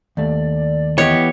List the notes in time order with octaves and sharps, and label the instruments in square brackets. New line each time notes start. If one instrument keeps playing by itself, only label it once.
[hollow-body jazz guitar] D#2 A3 [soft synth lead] D5
[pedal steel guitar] E3 B3 G4 [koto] C#5 [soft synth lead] D#5